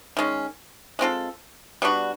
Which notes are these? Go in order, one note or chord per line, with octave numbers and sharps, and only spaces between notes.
D#3 G#3 C#4
G#3 C4 F4 A4
G3 B3 D4 F#4